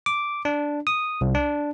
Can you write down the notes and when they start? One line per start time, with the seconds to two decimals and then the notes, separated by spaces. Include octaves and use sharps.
0.06 D6
0.45 D4
0.87 D#6
1.21 C2
1.35 D4